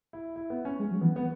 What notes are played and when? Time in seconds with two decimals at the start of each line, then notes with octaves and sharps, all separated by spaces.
0.13 E4
0.36 E4
0.50 B3
0.65 C#4
0.79 G#3
0.91 F#3
1.01 E3 B3
1.16 B3